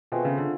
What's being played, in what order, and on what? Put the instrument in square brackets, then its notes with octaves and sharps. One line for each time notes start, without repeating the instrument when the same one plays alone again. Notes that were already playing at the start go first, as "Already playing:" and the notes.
[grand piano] B2 [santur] A3 C4 F4 G#4
[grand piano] C#3
D3